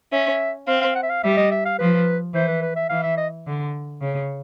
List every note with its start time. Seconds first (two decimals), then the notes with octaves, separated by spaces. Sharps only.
0.12 C#4 E5
0.67 C4 F5
0.81 F5
0.95 F#5
1.03 E5
1.09 F5
1.23 G3 E5
1.37 D#5
1.51 E5
1.65 F5
1.78 F3 B4
2.34 E3 C5
2.48 B4
2.62 B4
2.76 E5
2.89 E3 F5
3.03 E5
3.17 D#5
3.46 D3
4.01 C#3